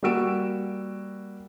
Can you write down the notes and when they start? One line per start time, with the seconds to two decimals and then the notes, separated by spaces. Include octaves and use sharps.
0.03 G3 A#3 F#4 E6 D7 E7